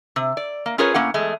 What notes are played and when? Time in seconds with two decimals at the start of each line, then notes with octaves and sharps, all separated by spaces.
0.16 C3
0.37 D5
0.66 A#3
0.78 C#4 F4 G#4 A#4 B4 C#5
0.94 A2 A#3 C#4 F#5
1.14 E2 G#3 A3